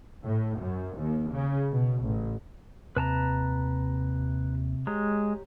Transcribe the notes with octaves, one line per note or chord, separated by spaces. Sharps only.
A2
F#2
D#2
C#3
B2
A1
D#2 C3 B4 A5 A#5
G#3 G4 C#5 A#5